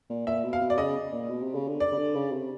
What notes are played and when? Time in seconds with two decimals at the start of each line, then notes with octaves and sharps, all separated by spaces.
0.10 A#2
0.27 A#2 E5
0.44 B2
0.53 F5
0.61 B2
0.70 D5
0.78 C#3 D#5
1.12 A#2
1.30 B2
1.42 C3
1.55 C#3
1.68 D3
1.80 D5
1.92 C#3
1.98 D3
2.15 C#3
2.32 C3